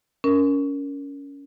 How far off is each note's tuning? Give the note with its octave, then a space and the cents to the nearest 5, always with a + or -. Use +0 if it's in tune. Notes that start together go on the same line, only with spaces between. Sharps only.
C#4 +20 A#4 +0